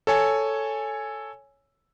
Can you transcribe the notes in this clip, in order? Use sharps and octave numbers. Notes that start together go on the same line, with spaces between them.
A4 C#5 G#5